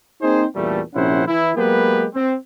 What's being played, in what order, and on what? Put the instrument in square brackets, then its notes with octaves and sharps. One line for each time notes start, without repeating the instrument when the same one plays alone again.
[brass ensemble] A#3 C4 D#4 G#4 C5
E2 G2 A#2 G3 A3
A#1 C3 C#4 E4 C5 F#5
E3 E4
F#3 G#3 A#3 B3 G4 B4
C4